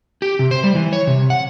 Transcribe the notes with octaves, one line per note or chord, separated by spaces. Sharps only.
G4
C3
C5
G3
E3
C#5
C3
F#5